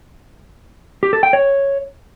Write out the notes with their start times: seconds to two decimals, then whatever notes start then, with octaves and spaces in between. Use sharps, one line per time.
1.03 G4
1.13 A4
1.23 G5
1.33 C#5